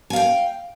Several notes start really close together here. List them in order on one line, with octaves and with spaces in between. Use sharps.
G#5 F5 G5